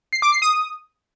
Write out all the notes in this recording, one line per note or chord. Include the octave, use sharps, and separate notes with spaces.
C7
D6
C7
D#6